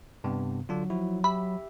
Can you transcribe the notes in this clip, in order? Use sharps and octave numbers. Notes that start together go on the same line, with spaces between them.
G2 C3 B3
D3 F#3 D4 F4
F3 E4 F#4
G4 E5 B5